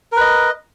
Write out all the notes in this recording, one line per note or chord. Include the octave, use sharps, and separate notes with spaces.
A#4 B4 D#5